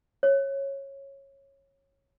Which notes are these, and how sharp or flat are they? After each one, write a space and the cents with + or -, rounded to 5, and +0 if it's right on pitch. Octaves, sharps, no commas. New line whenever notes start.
C#5 -15